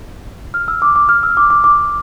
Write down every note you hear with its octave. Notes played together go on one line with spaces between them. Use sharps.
F6
E6
D6
D6
F6
E6
D6
D6
D6